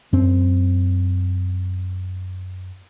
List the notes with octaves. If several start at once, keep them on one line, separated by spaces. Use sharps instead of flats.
F#2 C4